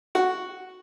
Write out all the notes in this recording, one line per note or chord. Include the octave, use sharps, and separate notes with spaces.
F#4